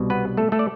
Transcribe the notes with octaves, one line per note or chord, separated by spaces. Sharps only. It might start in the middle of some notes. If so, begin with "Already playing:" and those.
Already playing: C2 B2 G3
B3 B4
A3 A4
A3 A4
D5